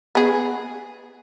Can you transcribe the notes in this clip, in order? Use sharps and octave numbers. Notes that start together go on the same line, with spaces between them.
B3 G#4